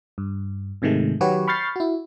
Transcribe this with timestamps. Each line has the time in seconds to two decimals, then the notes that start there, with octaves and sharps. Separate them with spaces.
0.18 G2
0.82 G#2 C3 D#3 G#3 A3
1.21 D#3 F#3 F#4 G4 B4 C#5
1.48 B5 C#6 F6 G6 A6 C7
1.76 E4 F#4